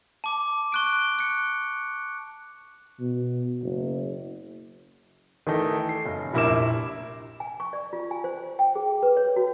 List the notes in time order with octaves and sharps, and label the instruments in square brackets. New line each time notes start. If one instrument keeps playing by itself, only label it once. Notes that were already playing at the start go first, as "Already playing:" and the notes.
[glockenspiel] A5 D6
C#6 F#6 D7
F#6 C#7
[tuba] B2
F#1
[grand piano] D#3 E3 A3 D#4
C7
F#1
F1 A#1 E4 A#4 D6 E7
[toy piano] G#5
C#6
D5
F4
G#5
C5
G5
G#4
B4
C#5
F#4